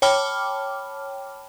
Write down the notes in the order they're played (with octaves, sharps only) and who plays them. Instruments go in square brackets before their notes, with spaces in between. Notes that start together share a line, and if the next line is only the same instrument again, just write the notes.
[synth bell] C#5 G5 A5 B5 D6 F6